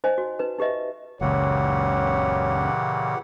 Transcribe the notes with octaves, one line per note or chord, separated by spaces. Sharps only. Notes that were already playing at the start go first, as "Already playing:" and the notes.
D#4 C5 D#5 G#5
F#4
D#4 B4
D#4 G4 B4 D#5 E5
F#1 C#2 A#2 C#3 E3 G4 C#5 F#5